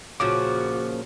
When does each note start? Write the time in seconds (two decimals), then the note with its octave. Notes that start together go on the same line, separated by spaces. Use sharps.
0.20 A#2 C#3 F3 F#4 D6